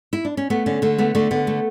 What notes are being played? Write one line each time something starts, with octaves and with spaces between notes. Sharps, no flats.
E4
D4
C#4
A3 B3
D3 C#4
D3 A3
A3 B3
D3 A3
D3 B3
A3